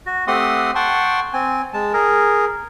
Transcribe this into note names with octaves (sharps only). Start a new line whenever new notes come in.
F#4
A3 C4 G4 F#5 C6 D#6
F#5 G5 A5 C6 C#6
C4 G#5
G#3 A5
G#4 A#4